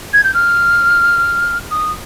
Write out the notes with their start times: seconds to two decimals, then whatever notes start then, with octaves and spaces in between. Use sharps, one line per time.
0.13 G#6
0.24 G6
0.34 F6
1.71 D#6